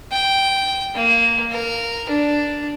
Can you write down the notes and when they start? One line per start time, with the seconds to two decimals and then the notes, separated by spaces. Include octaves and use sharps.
0.12 G5
0.95 A#3
1.52 A#4
2.09 D4